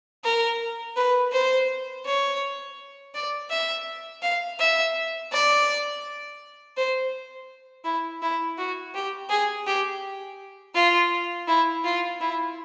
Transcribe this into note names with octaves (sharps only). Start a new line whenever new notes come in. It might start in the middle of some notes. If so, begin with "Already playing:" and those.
A#4
B4
C5
C#5
D5
E5
F5
E5
D5
C5
E4
E4
F#4
G4
G#4
G4
F4
E4
F4
E4